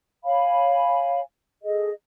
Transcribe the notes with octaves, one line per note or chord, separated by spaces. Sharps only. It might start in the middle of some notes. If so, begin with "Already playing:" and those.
C#5 F5 G#5 B5
G#4 A4 D#5